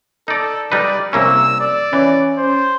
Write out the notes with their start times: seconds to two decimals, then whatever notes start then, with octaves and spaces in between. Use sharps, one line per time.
0.28 D#4 A4 D5
0.72 G3 D#4 B4 D5
1.13 C2 A#3 C#4 E6
1.60 D5
1.93 E3 C#4
2.38 C5